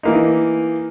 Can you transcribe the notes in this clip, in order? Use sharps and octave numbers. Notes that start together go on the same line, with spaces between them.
E3 A#3 D#4